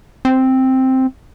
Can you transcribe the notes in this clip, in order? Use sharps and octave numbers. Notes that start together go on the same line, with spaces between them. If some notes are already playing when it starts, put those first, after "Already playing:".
C4